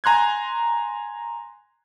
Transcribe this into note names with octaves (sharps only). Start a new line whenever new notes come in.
G#5 A#5 C6 F#6 G#6